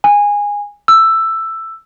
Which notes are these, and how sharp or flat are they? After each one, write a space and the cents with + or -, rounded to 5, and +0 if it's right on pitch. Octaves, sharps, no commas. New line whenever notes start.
G#5 -15
E6 +5